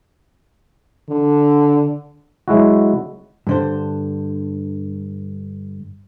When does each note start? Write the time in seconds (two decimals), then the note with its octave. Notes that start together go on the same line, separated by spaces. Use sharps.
1.10 D3
2.48 F#3 G#3 E4 F#4
3.47 G2 D3 C5